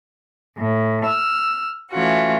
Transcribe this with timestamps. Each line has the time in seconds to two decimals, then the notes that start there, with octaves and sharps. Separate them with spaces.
0.56 A2
1.04 E6 F6
1.91 E3 A3 C#4 F4 F#4